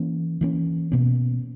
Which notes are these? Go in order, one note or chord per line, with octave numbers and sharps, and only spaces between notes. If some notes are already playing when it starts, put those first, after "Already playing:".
Already playing: E3 A#3 C#4
E3 A#3 C#4
B2 A#3 C#4